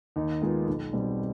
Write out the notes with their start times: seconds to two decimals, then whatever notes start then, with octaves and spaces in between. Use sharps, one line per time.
0.16 D#2 D#4
0.41 D#3 G#3 B3 F4
0.68 B1
0.93 B2 G3 C4